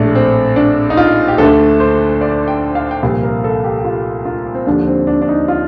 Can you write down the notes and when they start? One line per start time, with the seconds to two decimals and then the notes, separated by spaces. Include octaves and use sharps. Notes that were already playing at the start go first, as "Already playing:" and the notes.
Already playing: A#1 A2 A3 D4
0.15 C4
0.56 D4
0.90 D#4
0.97 F4
1.28 G4
1.38 D2 D3 A3 A4
1.80 C5
2.21 D5
2.48 G5
2.75 F5
2.91 G5
3.03 C2 A#2 F3 A#3 F5
3.23 A#4
3.44 A4
3.64 G4
3.79 G4
3.85 F4
4.25 F4
4.54 C4
4.67 D#2 D3 F3 D4
4.87 C4
5.07 D4
5.22 D4
5.29 D#4
5.48 F4